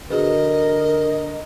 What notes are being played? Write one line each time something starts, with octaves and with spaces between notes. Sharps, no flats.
D3 F#4 G#4 A#4 B4 D#5